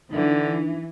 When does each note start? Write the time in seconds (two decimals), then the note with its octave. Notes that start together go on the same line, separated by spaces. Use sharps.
0.11 D3 E3 D4 D#4